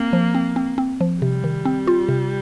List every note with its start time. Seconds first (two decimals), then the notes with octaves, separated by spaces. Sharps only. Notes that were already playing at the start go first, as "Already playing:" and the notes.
Already playing: A#3 C4
0.13 F3
0.35 C4
0.56 C4
0.78 C4
1.01 F3
1.22 C3 G3
1.44 D#3
1.65 C4
1.87 F4
2.09 C3